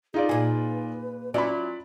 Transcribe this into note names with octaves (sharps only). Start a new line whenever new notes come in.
D#4 F4 G#4 D5
A#2 G#4 B4
F#3 C#4 E4 F4 D5 B5